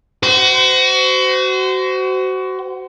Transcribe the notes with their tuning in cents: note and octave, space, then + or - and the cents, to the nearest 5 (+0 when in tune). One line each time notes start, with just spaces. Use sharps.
F#4 +25 C5 -25